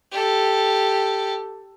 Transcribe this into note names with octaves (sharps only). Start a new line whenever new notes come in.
G4 A4